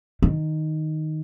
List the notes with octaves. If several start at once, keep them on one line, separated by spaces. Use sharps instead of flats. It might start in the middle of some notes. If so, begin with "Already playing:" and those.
D#3